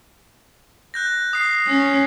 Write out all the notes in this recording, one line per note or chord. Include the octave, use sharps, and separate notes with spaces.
F#6 G6 A#6
D#6 C7
C#4